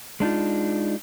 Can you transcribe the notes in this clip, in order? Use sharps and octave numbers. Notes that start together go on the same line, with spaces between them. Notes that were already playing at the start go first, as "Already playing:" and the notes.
G#3 D4 D#4 F4